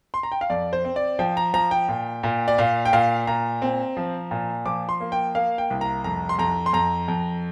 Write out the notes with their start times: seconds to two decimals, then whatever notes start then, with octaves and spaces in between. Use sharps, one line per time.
0.14 C6
0.23 A#5
0.32 G5
0.41 F5
0.50 F2 D5
0.73 C5
0.85 C4
0.96 D5
1.19 F3 G5
1.37 A#5
1.54 F3 A#5
1.71 G5
1.89 A#2
2.23 A#2
2.48 D5
2.58 A#2 F5
2.85 G5
2.93 A#2 F5
3.27 A#2 A#5
3.62 C4
3.97 F3
4.31 A#2
4.65 F3 D6
4.89 C6
5.00 A#3
5.12 G5
5.35 A#3 F5
5.58 G5
5.70 C2
5.81 A#5
6.04 F2 A#5
6.29 C6
6.39 F2 A#5
6.66 C6
6.73 F2 A#5
7.08 F2